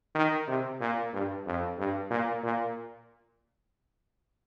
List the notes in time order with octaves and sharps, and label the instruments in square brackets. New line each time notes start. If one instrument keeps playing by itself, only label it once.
[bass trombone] D#3
C3
A#2
G2
F2
G2
A#2
A#2